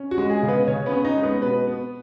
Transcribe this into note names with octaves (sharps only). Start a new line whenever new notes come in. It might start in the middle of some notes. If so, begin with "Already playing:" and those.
Already playing: C#4
F#4
G#3
G#4
C#3
B3 B4
C#3 C#4 C#5
B3 B4
C#4
D#4 D#5
G#3
B3 B4
B2 B3 B4
B3